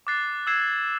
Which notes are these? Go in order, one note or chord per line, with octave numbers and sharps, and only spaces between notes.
D6 F#6 A6 C7
E6 G#6 C7 E7